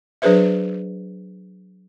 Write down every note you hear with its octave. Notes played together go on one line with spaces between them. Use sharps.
F#3 D4 G#4 B4 C5 E5